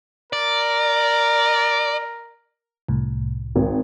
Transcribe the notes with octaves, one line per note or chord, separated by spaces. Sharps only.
A#4 D5
C2 A2
G#1